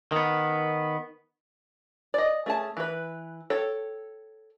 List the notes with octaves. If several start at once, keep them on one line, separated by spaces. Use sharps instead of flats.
D#3 B3
D5 D#5
A3 C#4 G#4 D5 A5
E3 B4
A4 C#5 G5